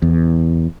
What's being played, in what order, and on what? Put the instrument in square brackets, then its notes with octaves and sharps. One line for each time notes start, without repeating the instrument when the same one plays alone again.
[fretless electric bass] E2